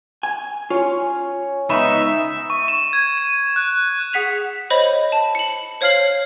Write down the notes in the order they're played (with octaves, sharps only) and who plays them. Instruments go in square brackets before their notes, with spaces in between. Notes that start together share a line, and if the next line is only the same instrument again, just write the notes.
[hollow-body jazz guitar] G#5
[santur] C#4 C#6 [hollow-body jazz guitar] F4
[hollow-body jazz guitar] C#2 B3 B5 [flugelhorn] D#4 [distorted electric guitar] E5 [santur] C#6
[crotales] C#6
E7
G#6
D#7
F#6
[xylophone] G#4 F#5 B6 F7
C5 C#5 D#5 B5
A5
C#7 F#7
C5 C#5 F5 F6 C7 F#7